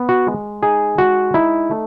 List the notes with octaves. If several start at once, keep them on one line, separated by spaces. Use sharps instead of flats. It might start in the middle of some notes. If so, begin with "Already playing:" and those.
Already playing: B3
F#4
G#3
D#4 G#4
G#3 F#4
D#4 E4
A3